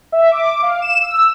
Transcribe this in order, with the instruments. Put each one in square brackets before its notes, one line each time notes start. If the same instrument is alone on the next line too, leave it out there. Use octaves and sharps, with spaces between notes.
[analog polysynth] E5
D6
F5
E7
E6
E6